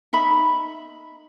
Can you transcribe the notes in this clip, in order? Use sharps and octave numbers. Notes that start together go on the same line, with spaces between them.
D#4 E5 B5